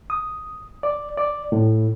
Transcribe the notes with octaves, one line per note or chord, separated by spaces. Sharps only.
D#6
D5
D5
A2